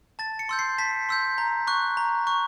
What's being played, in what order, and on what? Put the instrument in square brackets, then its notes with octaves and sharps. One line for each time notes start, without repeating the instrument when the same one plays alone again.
[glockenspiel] A5 A6
C#7
C6 E6 G6
C7
A5 B6
C6 E6 G6
A#5
C#6 F#6
A#5
C#6 F#6